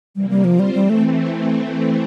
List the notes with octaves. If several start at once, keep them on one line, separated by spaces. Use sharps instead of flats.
C3 E3 G3 A#3
G3
D3 F3 G3 C4 F4 C5
G3
E3 G3 A3 C4
A3